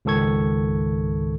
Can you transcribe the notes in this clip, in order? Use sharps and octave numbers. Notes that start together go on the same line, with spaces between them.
C#2 G#2 D#3 A4 C#6 G#6